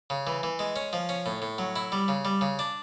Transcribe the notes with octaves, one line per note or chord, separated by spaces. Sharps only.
C#3
E3
E3
G#3
C#4
F3
C#4
A2
A2
F#3
E4
G3
C#3
G3
C#3
D4